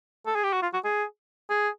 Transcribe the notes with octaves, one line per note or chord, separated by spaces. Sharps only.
A4
G#4
G4
F#4
F4
F#4
G#4
G#4